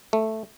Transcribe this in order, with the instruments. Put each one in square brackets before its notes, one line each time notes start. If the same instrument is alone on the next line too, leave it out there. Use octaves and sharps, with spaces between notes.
[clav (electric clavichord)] A3